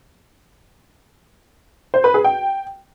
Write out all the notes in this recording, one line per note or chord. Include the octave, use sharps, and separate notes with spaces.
C5
B4
G#4
G5